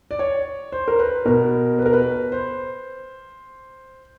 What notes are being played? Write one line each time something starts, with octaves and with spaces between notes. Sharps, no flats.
D5
C#5
C5
A#4
B4
B2 A#4
B4
A#4
B4
C5